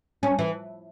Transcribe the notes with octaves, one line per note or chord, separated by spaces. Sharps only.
C#4
E3